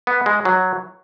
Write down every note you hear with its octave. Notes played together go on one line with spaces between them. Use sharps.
B3
G#3
F#3